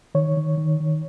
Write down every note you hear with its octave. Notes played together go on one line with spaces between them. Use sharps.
D#3 C#5
D#3
D#3
D#3